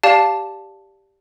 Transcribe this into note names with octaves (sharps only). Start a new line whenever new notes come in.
G4 D5 F5 A5